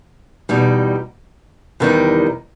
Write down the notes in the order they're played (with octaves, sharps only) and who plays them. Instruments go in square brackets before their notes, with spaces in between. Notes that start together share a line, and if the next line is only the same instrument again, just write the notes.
[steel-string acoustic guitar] E2 B2 G3 D#4
E2 C3 D#3 G3 D#4